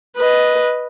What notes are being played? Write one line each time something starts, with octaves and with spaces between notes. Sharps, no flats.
B4 D#5